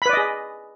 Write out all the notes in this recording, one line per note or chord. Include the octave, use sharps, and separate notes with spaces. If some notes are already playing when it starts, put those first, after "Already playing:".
G#4 B4 D5 D#5 B5